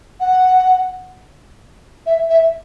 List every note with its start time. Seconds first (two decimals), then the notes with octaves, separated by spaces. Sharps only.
0.20 F#5
2.06 E5
2.30 E5